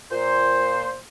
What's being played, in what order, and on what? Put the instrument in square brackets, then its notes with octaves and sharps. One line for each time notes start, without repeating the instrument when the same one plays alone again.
[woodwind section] A#2 C5